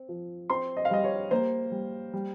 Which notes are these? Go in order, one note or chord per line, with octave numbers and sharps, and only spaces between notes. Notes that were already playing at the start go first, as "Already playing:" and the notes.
Already playing: C4
F3
C4 C6
D#5
F5
G3 D#5
C#5
A#3 C5
G3
G3